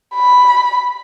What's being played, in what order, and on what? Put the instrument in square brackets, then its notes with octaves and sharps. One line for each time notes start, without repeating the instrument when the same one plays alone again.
[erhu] B5